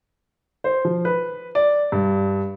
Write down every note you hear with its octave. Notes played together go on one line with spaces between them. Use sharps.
C5
F3
B4
D5
G2